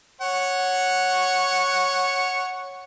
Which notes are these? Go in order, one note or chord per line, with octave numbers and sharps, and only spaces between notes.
C#5 F#5